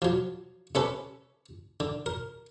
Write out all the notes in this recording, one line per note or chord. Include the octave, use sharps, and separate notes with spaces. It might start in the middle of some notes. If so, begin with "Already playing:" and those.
F3 F#3
C3 C#4 A4 B4
D3
A#4